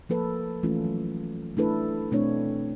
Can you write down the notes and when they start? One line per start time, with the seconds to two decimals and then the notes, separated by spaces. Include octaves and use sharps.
0.09 F3 A#3 A4 B4
0.63 E3 A3 C#4 F4
0.84 F#3
1.57 A3 D4 E4 A4 B4
2.11 B2 A3 C4 D4 C#5